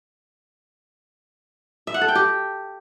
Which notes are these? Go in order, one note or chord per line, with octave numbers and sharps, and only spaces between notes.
E5
F#5
A4
G5
G4